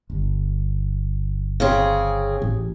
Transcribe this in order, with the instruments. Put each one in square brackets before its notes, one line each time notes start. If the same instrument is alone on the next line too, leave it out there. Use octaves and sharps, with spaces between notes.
[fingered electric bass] G1
[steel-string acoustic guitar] C#3 C4 G#4
[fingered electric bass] A1